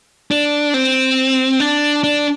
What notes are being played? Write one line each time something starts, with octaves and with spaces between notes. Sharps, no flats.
D4
C4
D4
D4